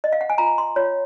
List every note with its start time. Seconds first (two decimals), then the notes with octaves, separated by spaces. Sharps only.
0.04 D#5
0.12 F5
0.21 F#5
0.30 G#5
0.38 F4 A#5
0.58 C6
0.76 F4 C#5